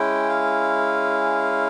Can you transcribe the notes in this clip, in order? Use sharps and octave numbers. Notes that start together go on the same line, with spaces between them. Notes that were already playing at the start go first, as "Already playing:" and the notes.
Already playing: G#3 C#4 E4 G5
F5